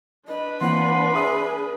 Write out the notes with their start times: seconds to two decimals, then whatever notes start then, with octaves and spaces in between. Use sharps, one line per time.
0.28 D4 B4 D#5
0.61 E3 A#3 C4 F#5 C6
1.14 G#4 E5 D#6